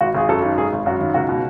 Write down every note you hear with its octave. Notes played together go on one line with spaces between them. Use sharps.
G#1 F#4
G#1 G#4
F#2 A4
D#3
G#1 G#4
G#1
F#2 F#4
D#3
C#2 F#4
B2